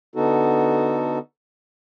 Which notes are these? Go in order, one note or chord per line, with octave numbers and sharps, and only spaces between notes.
D3 B3 D#4 F#4 A4